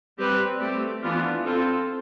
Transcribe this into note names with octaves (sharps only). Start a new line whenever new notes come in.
G3 C4 G4 B4
A3 C4 G4
E3 B3 D4 F4
C4 F4 A4 C5